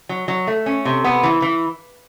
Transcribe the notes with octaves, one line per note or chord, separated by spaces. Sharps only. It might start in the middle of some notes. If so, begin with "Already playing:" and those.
F#3
F#3
A3
C#4
C3
B3
E3
E3